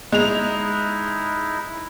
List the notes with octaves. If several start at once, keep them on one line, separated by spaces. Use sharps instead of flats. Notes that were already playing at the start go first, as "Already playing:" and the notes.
G#3 D#4 E4 F7